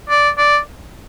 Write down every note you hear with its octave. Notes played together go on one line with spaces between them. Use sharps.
D5
D5